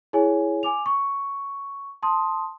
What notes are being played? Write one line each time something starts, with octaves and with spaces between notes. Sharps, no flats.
E4 G#4 C#5 G#5
G#5 D6 F7
C#6
A5 C6 D#6